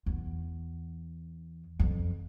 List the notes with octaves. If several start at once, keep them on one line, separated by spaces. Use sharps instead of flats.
E2
F2